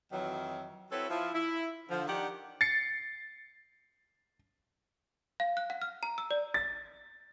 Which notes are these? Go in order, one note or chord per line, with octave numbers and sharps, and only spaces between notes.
F2 D#3 E3 F#3
C4 E4 F#4 A4 B4 C#5
F3 E4
E4
D3 F3
D#3 D4 G4 F#5
A6 C7 C#7
F5
F#6
F#5
F6
A#5
E6
D5
A6